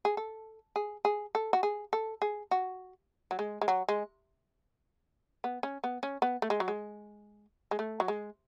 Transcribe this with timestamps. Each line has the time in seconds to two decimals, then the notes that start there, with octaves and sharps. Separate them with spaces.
0.05 G#4
0.17 A4
0.76 G#4
1.05 G#4
1.35 A4
1.53 F#4
1.63 G#4
1.93 A4
2.22 G#4
2.51 F#4
3.31 F#3
3.39 G#3
3.62 G#3
3.68 F#3
3.89 G#3
5.44 B3
5.63 C#4
5.84 B3
6.03 C#4
6.22 B3
6.42 A3
6.50 G#3
6.60 F#3
6.68 G#3
7.71 G#3
7.79 A3
8.00 F#3
8.08 G#3